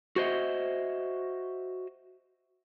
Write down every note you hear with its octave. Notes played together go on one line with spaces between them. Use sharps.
F#4 C5 D#5 E5